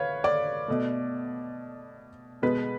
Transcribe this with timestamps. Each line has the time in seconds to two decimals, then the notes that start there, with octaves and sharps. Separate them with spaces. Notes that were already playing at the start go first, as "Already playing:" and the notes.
Already playing: B4 C#5 F5
0.24 D5
0.68 B2 A3
2.42 B2 G#3 B3 B4